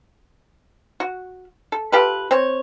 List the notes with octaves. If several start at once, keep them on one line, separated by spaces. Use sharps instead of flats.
F#4
A4
F4 G4 A4 B4
C4 C#5